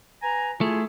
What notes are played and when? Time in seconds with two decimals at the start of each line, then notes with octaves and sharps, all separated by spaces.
0.23 B4 G#5 A#5
0.61 A3 E4 F4 G#4